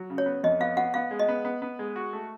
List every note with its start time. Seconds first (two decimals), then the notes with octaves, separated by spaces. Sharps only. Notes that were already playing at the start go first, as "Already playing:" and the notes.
Already playing: F#3
0.10 C#3
0.18 C#5
0.26 B3
0.43 F2 D#5
0.60 B3 F5
0.77 B3 F#5
0.94 B3 F5
1.11 G#3
1.19 D#5
1.28 B3
1.45 B3
1.62 B3
1.79 G#3
1.96 F#4
2.13 A3